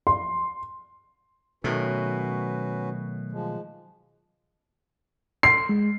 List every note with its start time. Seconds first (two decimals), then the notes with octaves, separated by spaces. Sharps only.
0.07 C6
1.64 B2 D#3 F#3 A3 C#4 F#4 B4
3.32 F3 G#3
5.43 C6 C7
5.69 G#3